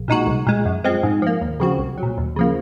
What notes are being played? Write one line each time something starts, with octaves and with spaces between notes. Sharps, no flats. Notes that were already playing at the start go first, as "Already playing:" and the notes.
Already playing: A#1
A#2 G#3 D#4 F#4
C2
A#2 G#3
F#2
F3 G#3 C4
G#2
F3 A#3
D#2
C#3 F3 C4 F#4
C2
F#3
A#2
D#2
C#3 F3 A#3